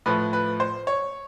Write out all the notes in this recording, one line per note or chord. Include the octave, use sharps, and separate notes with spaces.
A2 F3 B4
B4
C5
C#5